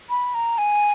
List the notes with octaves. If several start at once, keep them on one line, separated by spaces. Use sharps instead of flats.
B5
A#5
G#5